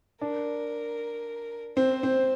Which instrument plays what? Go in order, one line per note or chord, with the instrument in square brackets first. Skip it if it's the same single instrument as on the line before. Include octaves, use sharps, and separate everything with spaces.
[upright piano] D4 [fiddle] A#4
[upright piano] C4 [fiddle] C5
[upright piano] C4